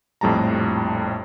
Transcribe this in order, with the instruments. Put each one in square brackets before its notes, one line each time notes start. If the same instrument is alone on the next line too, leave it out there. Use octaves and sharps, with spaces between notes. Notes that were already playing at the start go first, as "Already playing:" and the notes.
[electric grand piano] A#1 F2 A2 G3 A5 A#5